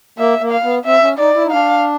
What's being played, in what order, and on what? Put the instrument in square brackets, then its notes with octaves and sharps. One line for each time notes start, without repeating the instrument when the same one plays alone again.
[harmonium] A#3 [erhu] E5
[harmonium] A#3
[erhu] F5
[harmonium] B3
[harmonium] C4 [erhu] E5
[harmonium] C#4
[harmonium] D#4 [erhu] D5
[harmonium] E4
D#4
[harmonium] D4 [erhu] F5